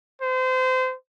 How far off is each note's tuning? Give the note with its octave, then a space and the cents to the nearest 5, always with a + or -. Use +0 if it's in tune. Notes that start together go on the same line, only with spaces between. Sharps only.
C5 -30